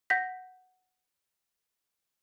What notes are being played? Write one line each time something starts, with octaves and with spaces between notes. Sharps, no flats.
F#5 G6 A#6 B6